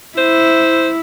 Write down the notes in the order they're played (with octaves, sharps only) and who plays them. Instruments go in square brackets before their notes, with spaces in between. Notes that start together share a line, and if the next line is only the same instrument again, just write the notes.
[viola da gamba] E4 [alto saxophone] C5